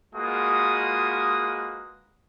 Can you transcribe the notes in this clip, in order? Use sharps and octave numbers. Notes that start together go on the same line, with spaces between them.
G#3 A#3 F4 F#4 B4 D#6